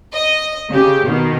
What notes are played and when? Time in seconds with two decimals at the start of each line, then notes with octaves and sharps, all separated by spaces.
0.13 D#5
0.70 C#3 G4
1.04 B2 D#3